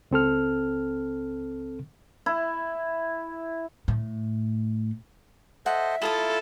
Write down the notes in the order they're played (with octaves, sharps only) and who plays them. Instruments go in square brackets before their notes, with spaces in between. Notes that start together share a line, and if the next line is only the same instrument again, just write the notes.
[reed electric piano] C#2 C4 A4 F6
[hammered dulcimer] E4
[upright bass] A2
[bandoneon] A4 C5 D#5 [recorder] E5 [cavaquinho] F#5
[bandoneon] E4 F4 C6 [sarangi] A4 [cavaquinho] A5 A#5 D#6